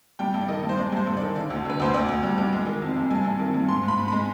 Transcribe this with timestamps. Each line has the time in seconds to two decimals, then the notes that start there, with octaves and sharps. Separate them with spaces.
0.19 G3 G5
0.34 G2
0.41 D5
0.48 D#3 D#5
0.63 G2
0.69 C5
0.77 G#3 D5
0.92 G2 C5
1.07 G2
1.17 D#3 D5
1.36 D3 D5
1.50 D2
1.65 D3 B4
1.80 D2 C5
1.94 D2 D5
2.09 D2
2.23 G3
2.38 G3
2.53 G#3
2.66 D#3
2.82 F2
2.96 F2
3.10 G2 G#5
3.25 G2
3.39 D#3
3.54 G2
3.68 G#2 C6
3.83 G#2
3.88 B5
3.98 G#2
4.08 G#3 B5